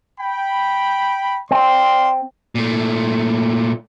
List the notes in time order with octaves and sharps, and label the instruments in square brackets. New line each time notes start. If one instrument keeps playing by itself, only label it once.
[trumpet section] G5 B5
[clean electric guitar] C4 [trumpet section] D5 F5 C6
[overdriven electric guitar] A#2 A3